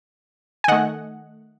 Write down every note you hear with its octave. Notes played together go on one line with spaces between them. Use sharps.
G#5
D#3 A3 D#5 F#5